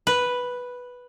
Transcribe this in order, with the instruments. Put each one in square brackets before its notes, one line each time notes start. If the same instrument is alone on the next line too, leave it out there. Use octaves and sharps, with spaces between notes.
[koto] B4